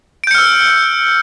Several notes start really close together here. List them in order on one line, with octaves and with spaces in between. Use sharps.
D7 G6 C#7 F6 E6